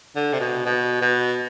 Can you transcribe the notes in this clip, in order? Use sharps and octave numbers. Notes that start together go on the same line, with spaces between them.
D3
C3
B2
B2
B2